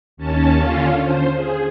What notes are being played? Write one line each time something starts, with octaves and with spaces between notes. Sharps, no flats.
D#2 C#4 A5
D3 C#4 F4 F5
C5
G#4